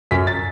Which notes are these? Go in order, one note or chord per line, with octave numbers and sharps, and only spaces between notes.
F#2 B6
A6